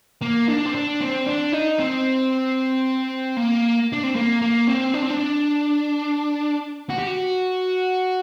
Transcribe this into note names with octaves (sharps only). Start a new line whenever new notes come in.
A#3
D4
C4
D4
C4
D4
D#4
C4
A#3
D4
C4
A#3
A#3
C4
D4
C4
D4
F#4
G4
F#4